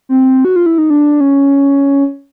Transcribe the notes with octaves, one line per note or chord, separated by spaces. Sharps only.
C4
F#4
F4
E4
D#4
D4
C#4